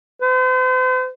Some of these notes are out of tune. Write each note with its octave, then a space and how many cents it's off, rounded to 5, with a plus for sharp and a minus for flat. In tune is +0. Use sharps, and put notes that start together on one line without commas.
C5 -45